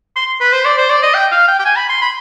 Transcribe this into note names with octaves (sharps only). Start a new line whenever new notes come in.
C6
B4
C5
D5
C5
D5
D#5
G5
F5
G5
G5
G#5
B5
C6
B5